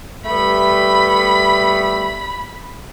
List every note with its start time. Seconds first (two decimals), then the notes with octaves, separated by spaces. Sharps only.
0.26 G3 A3 B3 B5